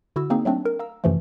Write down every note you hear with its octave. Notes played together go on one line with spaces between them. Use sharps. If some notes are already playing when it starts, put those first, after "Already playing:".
D3 E4 F#4 E6
A#3 C4 D#4 G#4
F#3 A3 C4 D4
A#4
F5 A#5 E6
F#2 C3 E3 F3 A3